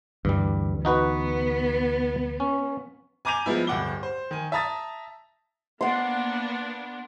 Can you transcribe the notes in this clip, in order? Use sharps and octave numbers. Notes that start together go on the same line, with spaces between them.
D2 G2 E3 G3
B3 D#4 F#4 B4
C#4
G#5 A#5 D6 G6 D#7 F7
F3 G#3 B3 E4
D1 G2 F#5 D6 G7
C5
D#3 G#5
E5 A5 A#5 D#6 A6
A#3 B3 D4 F#5 C6